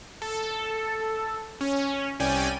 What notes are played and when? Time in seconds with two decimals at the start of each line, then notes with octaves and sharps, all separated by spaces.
0.22 A4
1.61 C#4
2.20 C2 C#4 D5 G5 G#5 D#7